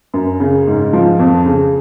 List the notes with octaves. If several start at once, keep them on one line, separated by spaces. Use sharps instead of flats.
F#2
C#3
G#2
F3
F2
C#3